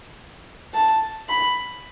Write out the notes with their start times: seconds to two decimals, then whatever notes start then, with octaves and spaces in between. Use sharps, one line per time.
0.74 A5
1.29 B5